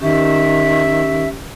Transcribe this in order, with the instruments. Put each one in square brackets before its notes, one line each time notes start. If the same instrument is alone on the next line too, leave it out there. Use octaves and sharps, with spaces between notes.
[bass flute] D#3 [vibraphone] C#4 G4 C#6 [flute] E5